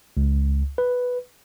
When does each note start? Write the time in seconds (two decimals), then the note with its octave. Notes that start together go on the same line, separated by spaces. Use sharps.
0.17 C#2
0.78 B4